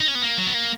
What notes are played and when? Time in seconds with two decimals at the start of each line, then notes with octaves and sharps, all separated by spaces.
0.01 D#4
0.08 C#4
0.15 B3
0.22 A#3
0.38 F#3
0.46 B3
0.54 A#3